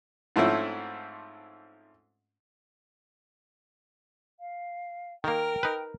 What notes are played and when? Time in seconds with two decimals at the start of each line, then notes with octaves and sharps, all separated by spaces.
0.36 G#2 F3 A3 C4 C#4 E4
4.40 F5
5.24 D#3 A#3 A#4 G5
5.63 D#4 B4